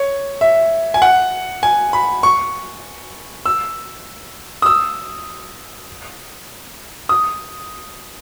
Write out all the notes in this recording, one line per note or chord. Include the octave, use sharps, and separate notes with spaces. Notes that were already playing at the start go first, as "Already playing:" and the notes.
Already playing: C#5
E5
G#5
F#5
G#5
B5
C#6
E6
D#6
E6
D#6